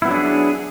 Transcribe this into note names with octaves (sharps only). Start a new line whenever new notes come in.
F#3 B3 D4 E4 G#4